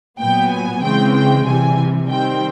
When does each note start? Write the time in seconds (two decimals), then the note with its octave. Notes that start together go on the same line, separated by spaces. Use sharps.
0.19 A#2 F#3 B3 G5
0.51 G#5
0.82 C#3 E3 G#3 C4 G5
1.14 G5
1.45 C3 E3 G3 G#5
2.08 D#3 G3 C4 G5